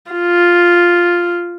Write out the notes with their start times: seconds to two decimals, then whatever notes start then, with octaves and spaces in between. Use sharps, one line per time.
0.11 F4